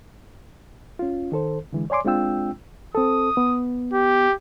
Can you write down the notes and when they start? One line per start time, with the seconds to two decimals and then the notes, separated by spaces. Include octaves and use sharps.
0.99 C#4 F4
1.32 D#3 A4 C5
1.73 D3 E3 G#3
1.90 C#5 D5 G#5 C6 D6
2.05 G#3 C4 D4 F4 G5 E6
2.95 C4 A4 D#6
3.37 B3
3.93 G4